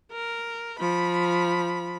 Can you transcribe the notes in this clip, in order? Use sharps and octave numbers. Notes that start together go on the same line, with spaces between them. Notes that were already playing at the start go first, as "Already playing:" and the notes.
A#4
F3 B5